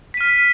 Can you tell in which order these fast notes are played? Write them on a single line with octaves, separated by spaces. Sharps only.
B6 D#7 F6